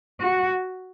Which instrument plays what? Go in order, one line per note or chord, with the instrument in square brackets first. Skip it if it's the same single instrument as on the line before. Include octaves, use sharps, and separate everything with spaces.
[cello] F#4